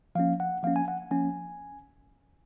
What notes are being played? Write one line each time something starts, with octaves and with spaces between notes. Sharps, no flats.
F3 A#3 C#4 F5
F#5
F3 A#3 C#4 F5
G#5
F#5
F3 A#3 C#4 G#5